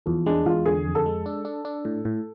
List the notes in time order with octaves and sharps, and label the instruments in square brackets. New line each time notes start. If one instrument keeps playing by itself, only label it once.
[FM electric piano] E2 [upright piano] F3
[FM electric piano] G#3 [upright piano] D4
[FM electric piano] E2 [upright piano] F4
[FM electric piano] D3 [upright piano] G#4
[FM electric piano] F2
[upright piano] A4
[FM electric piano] G#3
D4
D4
D4
A2
A2